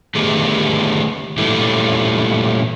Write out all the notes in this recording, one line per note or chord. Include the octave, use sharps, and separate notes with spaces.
D3 D#3 A3 B3 G4 G#4
A#2 E3 G3 A3